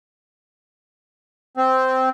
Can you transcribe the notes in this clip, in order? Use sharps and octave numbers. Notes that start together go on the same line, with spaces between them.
C4